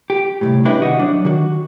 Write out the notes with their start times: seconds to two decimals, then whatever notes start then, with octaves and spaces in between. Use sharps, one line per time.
0.10 G4
0.41 C2 F2 A2
0.65 C#4 D4 E4 G4 B4 D#5
0.82 C2 D#3 F#4 D#5
0.99 F#3 D4
1.25 D#3 F#4